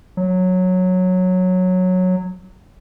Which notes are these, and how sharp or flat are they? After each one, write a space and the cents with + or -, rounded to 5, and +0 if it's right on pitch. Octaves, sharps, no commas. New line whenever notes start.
F#3 -10